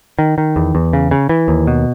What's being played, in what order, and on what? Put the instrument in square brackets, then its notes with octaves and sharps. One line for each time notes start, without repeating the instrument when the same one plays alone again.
[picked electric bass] D#3
D#3
E2
E2
C#3
C#3
E3
D#2
B2